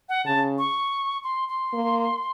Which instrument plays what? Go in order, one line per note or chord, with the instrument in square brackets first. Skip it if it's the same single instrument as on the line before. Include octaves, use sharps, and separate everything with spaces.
[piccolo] F#5
[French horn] C#3 [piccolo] A5
[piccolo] C#6
C6
C6
[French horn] A#3